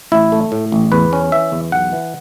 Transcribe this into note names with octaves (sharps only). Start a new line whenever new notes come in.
A1 E4
A3
A2
A1
E2 B4
C#4
E3 E5
E2
B1 F#5
E3